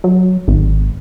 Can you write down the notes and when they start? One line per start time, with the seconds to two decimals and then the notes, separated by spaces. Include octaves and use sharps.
0.04 F#3
0.48 G#1